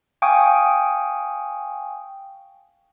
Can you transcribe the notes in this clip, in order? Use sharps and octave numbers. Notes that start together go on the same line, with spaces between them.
F5 G5 G#5 C#6 D#6